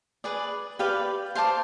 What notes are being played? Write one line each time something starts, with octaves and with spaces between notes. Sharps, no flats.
G#4 B4 D5
G4 B4 D5 F5
C5 F5 A5 D6